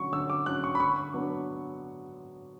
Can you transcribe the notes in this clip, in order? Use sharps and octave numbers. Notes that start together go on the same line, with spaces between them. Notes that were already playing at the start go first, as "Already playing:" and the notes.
Already playing: D3 F#3 C#4 C#6
D3 E6
D6
F#3 C#4 F#6
C#6
B5
D3 C#6
F#3 B3 D4